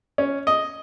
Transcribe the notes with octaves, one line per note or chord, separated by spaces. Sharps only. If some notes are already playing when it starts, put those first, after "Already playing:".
C#4
D#5